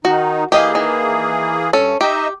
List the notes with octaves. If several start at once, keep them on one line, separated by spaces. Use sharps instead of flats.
D#3 D#4 F#4
E3 A#3 G4 G#4 D#5 F5
D#3
G2 C#4 A4
D#4 G4 D#5 E5